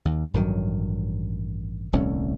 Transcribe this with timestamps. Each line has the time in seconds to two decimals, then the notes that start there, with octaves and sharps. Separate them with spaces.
0.05 D#2
0.34 A1 G2 D#3 F#3
1.92 D#1 C2 A3 C#4